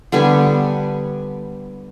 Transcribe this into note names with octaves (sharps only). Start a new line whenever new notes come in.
D3 G3 B3 G#5